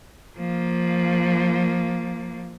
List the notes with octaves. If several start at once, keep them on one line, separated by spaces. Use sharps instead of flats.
F3 A#3